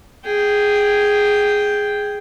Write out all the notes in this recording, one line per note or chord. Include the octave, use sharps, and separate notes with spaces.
G#4 G5